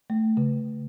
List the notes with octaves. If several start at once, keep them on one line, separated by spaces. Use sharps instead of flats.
A3
C#3